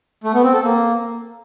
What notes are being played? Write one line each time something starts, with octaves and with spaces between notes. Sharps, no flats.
A3
B3
C4
A4
A#3